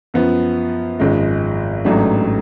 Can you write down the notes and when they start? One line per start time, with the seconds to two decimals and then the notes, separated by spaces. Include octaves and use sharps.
0.14 F#2 F3 B3
1.00 G#1 F#2 F3 G#3
1.85 A1 G#2 F#3 A3 D4